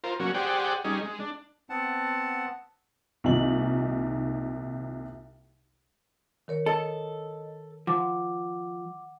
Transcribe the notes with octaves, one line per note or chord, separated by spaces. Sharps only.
F4 A#4 C5
F#3 A#3 C#4 F#4
G4 G#4 C5 D5 F#5 G5
G3 C#4 D#4 G#4
G#3
D4
B3 C4 F#5 A5
C2 A#2 D#3 F3 D#4 F#7
D#3 A#4 C#5
A4 D#5
F3 F#5 D6